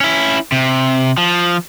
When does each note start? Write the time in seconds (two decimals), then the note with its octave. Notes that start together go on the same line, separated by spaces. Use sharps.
0.01 C#4 E4
0.52 C3
1.18 F3